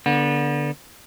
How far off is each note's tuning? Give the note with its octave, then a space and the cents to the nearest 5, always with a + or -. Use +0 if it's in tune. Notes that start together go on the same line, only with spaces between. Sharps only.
D3 -10 B3 -30